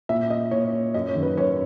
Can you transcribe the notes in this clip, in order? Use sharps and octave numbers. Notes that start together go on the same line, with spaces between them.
A#2 E5
D#5
A#2 C#5
F#2 D#5
C#5
D#3
B4
F#2 C#5